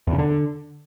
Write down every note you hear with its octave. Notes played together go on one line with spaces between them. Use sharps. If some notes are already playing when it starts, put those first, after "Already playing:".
E2
C#3
D3